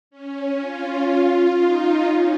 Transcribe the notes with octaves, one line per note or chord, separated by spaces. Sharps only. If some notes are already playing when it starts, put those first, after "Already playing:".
C#4
F4
F4
D#4
C#4